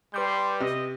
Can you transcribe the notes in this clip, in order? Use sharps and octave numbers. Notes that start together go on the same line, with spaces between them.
G3 B4 C6 D6 G6
C3 D#5